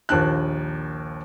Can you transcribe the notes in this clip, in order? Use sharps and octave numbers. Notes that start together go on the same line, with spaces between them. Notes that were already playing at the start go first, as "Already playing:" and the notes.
A#1 D#2 D4 F#6